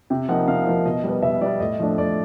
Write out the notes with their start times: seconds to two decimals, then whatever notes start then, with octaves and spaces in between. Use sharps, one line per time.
0.10 C3 G5
0.29 F3 A#3 D#4 F#5
0.48 C3 F5
0.66 F3 A#3 D#4
0.85 B2 D#5
1.04 G3 B3
1.22 B2 E5
1.41 G3 B3 D5
1.60 A2 D#5
1.79 F3 A3 D4
1.98 A2 D5